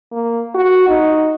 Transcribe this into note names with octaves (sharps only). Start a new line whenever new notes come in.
A#3
F#4
D#4